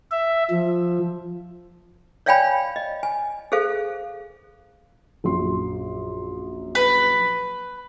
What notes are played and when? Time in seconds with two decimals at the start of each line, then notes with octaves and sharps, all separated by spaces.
0.11 E5
0.51 F3
2.26 C#5 D5 F5 G5 G#5 B5
2.76 D#5
3.03 G#5
3.52 G#4 A4 C5 F5
5.24 A#1 F#2 C6
6.75 B4